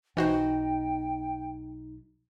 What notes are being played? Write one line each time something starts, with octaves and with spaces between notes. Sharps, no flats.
B1 E3 B3 D#4 F#4 C5 G5